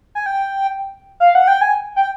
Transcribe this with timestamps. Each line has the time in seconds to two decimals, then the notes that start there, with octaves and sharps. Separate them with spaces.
0.15 G#5
0.26 G5
1.20 F5
1.35 F#5
1.48 G5
1.61 G#5
1.96 G5